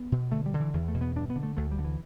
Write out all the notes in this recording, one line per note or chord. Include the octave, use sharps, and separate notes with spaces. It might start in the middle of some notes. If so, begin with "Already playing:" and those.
Already playing: B3
B2
D3 A3
G3
D3
E3
E2 E3
A3
B2
B3
G2 D4
B3
D3
A3
D2 A3
G3
D3
E3